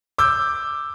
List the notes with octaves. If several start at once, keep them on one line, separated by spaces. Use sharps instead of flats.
D6 E6 G6